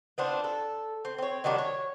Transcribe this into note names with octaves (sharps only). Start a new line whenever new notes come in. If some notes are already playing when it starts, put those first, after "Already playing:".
B3 C4 D4 F4
A4
C4
C4 C#5
D#3 F#3 G3 D4
C#5